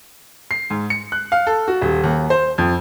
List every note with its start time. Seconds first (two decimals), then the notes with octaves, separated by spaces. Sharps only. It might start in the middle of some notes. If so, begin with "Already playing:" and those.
0.51 C7
0.70 G#2
0.90 C#7
1.12 F#6
1.32 F5
1.47 A4
1.68 F#4
1.81 D#1
2.04 D#2
2.30 C5
2.58 F2